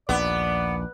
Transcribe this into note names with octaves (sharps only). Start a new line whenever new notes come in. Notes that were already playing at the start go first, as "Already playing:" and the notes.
A#1 D#2 B3 D5